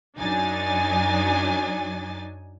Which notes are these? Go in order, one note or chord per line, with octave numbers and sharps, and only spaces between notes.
F#2 F#3 D4 D#4 G#5 A6